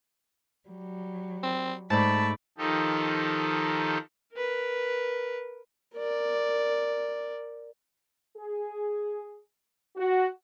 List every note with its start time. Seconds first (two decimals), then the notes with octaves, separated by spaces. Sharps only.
0.68 F#3 G3
1.43 C4
1.90 G#2 A3 D5 A5 B5 C#6 D6
2.58 D#3 F3 D#4 G4 A4
4.34 A#4 B4
5.96 A#4 D5
8.37 G#4
9.96 F#4